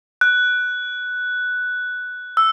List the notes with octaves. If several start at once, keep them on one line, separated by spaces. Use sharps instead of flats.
F#6
E6